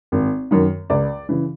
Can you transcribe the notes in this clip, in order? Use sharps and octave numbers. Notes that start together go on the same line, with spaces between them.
G#1
F#2 D#3
C#2 D5
C#3 E3